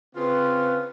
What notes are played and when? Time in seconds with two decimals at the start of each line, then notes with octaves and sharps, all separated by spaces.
0.15 C#3 C4 F4 B4